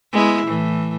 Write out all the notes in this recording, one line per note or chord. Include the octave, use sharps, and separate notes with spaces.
G#3 B3 E4
A2 E3